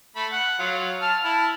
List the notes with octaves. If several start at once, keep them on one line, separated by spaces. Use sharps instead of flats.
A3 B5
F#5
F#3 F4
A5 F6
E4 A5